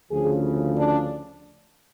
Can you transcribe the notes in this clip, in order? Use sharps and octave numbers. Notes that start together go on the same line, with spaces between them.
D2 C#3 F3 G#4
D4